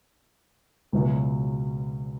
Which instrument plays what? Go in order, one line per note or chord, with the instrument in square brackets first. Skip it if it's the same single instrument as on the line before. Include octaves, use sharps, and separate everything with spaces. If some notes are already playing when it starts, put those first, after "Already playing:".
[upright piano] C#2 B2 F#3 B3 E4